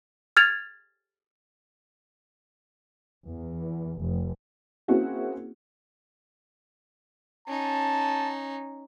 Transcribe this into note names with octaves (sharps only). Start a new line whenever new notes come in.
F6 G#6 A6 F7
E2
F1
A#3 C4 C#4 E4 F#4 G#4
C#4 D#4 A5